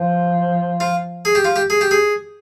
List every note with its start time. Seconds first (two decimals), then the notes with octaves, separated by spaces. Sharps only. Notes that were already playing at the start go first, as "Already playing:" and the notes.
Already playing: F3
0.80 F4
1.25 G#4
1.35 G4
1.45 F4
1.56 G4
1.70 G#4
1.81 G4
1.91 G#4